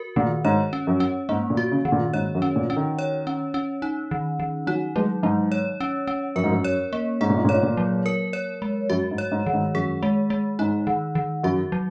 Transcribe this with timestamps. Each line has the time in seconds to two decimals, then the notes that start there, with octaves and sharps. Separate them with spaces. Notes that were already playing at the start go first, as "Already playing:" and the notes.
Already playing: F#4 A#4
0.16 A#2 D#3
0.45 G#2 C#5
0.73 C#4
0.87 F#2
1.00 C#4
1.29 G#2 A#3
1.50 A#2
1.57 F#4
1.71 C#3
1.85 D#3
1.92 A#2
2.14 G#2 C#5
2.35 F#2
2.42 C#4
2.56 A#2
2.70 C#4
2.77 D#3
2.99 C#5
3.27 C#4
3.54 C#4
3.82 D#4
4.11 D#3
4.40 D#3
4.67 F#3 D#4
4.96 F#3 G#3
5.23 G#2 F#3
5.52 C#5
5.80 C#4
6.07 C#4
6.36 F#2 A#4
6.44 G#2
6.51 F#2
6.64 C#5
6.93 A#3
7.21 G#2 G#4
7.30 A#2
7.38 G#2
7.45 A#2
7.49 G#2 C#5
7.63 A#2
7.77 F#3
8.06 A#4
8.33 C#5
8.62 G#3
8.90 F#2 F#4
9.11 G#2
9.18 C#5
9.32 G#2
9.46 D#3
9.53 G#2
9.75 F#2 G#4
10.03 G#3
10.30 G#3
10.59 G#2 D#4
10.87 D#3
11.15 D#3
11.44 F#2 F#4
11.72 F#3